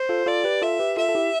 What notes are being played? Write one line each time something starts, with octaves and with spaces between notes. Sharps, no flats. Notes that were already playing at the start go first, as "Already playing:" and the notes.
Already playing: C5
F4 A4
F4 A4 D5
G4 B4
F4 A4 E5
G4 B4
F4 A4 E5
A4
E4 G4